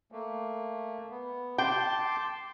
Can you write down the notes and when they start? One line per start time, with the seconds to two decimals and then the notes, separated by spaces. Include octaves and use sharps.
0.12 A3 A#3
1.10 B3
1.58 G5 A5 C6 D6